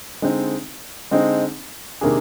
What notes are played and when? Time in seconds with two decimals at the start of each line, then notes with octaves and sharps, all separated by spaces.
0.22 D3 G#3 C4 D#4
1.11 D3 G#3 C4 D#4
2.01 C3 D#3 A#3 D4 G#4